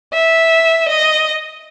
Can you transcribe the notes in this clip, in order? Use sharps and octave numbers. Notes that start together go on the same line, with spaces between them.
E5
D#5